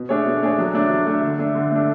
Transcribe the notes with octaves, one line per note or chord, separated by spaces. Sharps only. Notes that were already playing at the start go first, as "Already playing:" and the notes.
Already playing: B2
A3 D4 G#4 C#5
B2
A3 D4 G#4 C#5
F#3
A3 D4
F#3
A3 D4
D3
A3 D4
D3
A3 D4